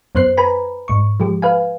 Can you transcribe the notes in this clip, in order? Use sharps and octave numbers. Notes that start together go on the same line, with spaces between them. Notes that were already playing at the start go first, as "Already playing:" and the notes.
F#2 B3 C5 F#6 C7
B4 G#5 A#5 B5
G#2 C#6
F3 G#3 G4
B4 F5 G#5